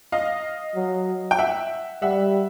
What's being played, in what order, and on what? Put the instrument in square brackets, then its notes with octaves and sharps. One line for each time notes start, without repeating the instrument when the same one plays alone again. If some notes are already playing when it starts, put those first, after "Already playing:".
[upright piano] D#5 F5
[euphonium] F#3
[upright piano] G5
E5 F#5
[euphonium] G3 [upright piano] E5 F#5